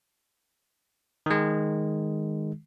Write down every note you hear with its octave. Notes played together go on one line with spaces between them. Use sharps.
D#3 G#3